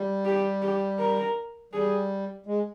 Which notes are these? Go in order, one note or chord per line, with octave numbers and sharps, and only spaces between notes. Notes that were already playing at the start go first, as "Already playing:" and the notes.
Already playing: G3
G4
G4
A#4
G3 G#4
G#3